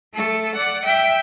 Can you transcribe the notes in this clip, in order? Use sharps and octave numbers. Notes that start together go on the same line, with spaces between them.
A3 A4
D5 F#5
E5 G5